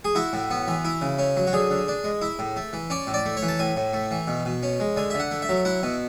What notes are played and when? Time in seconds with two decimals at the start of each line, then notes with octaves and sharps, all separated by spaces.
0.05 G#4
0.15 E4 F#4
0.33 A2
0.51 B3
0.68 E3
0.85 E4
1.02 C#3
1.19 C#4
1.37 F#3
1.47 F#4
1.53 D3 G#4
1.70 D3
1.88 D4
2.04 G#3
2.22 E4
2.39 A2
2.56 A3
2.73 E3
2.90 C#4 D5
3.07 A2
3.14 D5
3.26 A3
3.37 C#5
3.42 E3
3.48 A5
3.59 A2 G#5
3.77 A2
3.93 A3
4.11 E3
4.28 B2
4.45 B2
4.63 C#4
4.80 G#3
4.97 D3 G#5
5.10 D3 E5
5.20 F#5
5.31 A3
5.42 E5
5.49 F#3
5.65 E4 F#5
5.83 B2